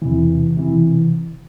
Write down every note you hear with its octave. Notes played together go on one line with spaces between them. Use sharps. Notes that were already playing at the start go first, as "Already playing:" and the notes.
E2 C3 E3
C3 E3